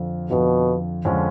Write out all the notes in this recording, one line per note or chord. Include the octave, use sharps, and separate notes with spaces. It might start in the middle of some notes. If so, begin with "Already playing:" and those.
Already playing: F2 D3 F3
F2 B2 D3 F3
F2 D3 F3 G#3 C#4